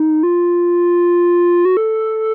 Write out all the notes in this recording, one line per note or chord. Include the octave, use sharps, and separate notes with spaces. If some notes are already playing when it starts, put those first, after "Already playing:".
Already playing: D#4
F4
F#4
A4